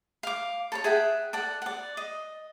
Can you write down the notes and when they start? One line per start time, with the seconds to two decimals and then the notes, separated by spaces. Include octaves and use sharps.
0.23 F5 D6
0.72 A4 A#4 C#5
0.84 G#4 E5 F#5 G5
1.33 A4 D5 F#5
1.62 D5 F#5
1.97 D#5